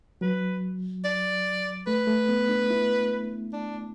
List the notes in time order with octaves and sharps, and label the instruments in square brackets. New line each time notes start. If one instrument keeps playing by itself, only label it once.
[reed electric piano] F#3 [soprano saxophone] B4
[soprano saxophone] D5
[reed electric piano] A3 [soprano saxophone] B4
[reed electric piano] A3
B3
D4
E4
[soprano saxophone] D4